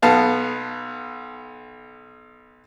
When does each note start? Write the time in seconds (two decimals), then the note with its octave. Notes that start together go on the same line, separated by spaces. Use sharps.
0.02 B1 B3 F5 A5